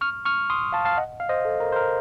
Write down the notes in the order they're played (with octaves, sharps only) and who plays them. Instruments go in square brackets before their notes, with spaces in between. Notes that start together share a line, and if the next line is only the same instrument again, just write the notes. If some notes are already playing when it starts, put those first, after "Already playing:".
[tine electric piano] C#6 F6
C#6 F6
C6 D#6
F5 A5
F5 A5
D#5 F#5
F5
C5 D#5
A4
A#4
C5
A#4